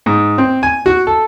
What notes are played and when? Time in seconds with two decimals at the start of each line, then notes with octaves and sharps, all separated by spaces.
0.06 G#2
0.38 C4
0.63 G#5
0.86 F#4
1.07 A4